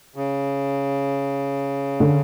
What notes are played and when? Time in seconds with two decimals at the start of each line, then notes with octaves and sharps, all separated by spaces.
0.16 C#3
2.00 D3